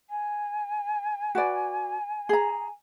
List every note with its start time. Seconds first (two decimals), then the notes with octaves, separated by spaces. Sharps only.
0.09 G#5
1.35 F#4 B4 D5
2.29 G#4 A#5